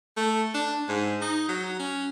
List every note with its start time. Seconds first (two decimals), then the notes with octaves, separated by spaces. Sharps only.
0.17 A3
0.55 D4
0.88 G#2
1.21 D#4
1.48 F#3
1.79 C#4